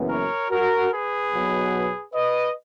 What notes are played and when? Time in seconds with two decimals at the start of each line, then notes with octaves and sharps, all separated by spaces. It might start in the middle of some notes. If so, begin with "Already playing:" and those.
Already playing: F#1 F#2 E3 B3
0.10 A#4 C#5
0.50 F#4 A#4
0.92 G#4 B4
1.33 B1 B2 F#3 B3
2.14 B4 D#5